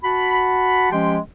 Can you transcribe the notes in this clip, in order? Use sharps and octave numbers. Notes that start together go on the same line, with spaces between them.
F#4 F#5 A5 B5
F3 G#3 C#4 G4 G5 C6